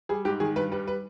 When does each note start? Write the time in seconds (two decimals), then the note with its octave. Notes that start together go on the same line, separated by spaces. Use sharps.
0.09 G3 G#4
0.25 G#2 G4
0.40 D#3 G#4
0.56 G2 B4
0.71 G3 B4
0.88 B4